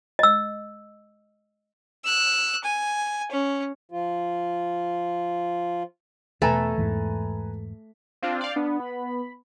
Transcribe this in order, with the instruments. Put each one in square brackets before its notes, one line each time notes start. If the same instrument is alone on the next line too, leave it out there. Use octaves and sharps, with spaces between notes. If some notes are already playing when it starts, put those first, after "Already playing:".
[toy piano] D#5 E6
[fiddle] E6 F#6
G#5
C#4
[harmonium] F3 F4
[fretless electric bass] E2 B2 [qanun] A3 A4 [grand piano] B4 G#5 A#5
[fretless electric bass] E2 G#2 E3
[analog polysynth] C4 D4 F4 [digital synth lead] F5
[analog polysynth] D5 F5 [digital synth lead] G6
[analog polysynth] B3 [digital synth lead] D4
[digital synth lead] B5